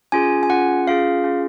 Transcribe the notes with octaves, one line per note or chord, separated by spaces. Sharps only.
C#4 F4 G#4 G#5
G#5
C#4 F4 G#4 F#5
C#4 F4 G#4 F5
C#4 F4 G#4